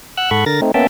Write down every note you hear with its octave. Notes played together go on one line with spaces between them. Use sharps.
F#5 E6 F#6
G#2 A4 F#5 B5 C#6
D3 A#4 A6 A#6
A3 C4 D#4
A#3 B3 C#4 E5 G5 A5